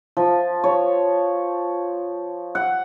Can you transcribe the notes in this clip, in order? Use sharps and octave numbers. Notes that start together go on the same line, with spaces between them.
F3
C#5
F#5